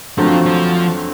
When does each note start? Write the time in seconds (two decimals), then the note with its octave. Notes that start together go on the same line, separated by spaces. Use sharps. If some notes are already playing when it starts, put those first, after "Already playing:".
0.17 F2 D3 F3 F#3 A3 C4
0.46 F3